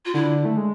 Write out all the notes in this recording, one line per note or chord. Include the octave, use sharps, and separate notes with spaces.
F4
D3 E4
A3
G#3